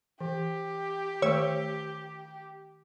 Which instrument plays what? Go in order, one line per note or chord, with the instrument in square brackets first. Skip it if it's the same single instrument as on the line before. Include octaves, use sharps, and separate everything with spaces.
[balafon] E3 [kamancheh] G4
[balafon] D#3 A3 C5 [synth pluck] C#5 E6